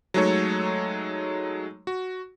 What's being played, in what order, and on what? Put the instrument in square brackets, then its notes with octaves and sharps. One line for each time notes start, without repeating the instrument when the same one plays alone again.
[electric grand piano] F#3 G#3 A3 D#4 A4 C#5
F#4